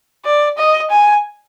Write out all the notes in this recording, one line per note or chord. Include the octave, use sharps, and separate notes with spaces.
D5
D#5
G#5